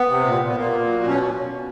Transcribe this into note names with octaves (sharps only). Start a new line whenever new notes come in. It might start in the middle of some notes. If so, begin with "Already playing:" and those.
Already playing: B3
C3
A#2
A#2
B3
A#2 A#3
A#2
F#3
B2 C#4